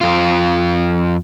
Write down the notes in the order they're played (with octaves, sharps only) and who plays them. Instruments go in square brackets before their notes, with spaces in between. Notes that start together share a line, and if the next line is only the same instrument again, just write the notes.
[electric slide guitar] F2 F4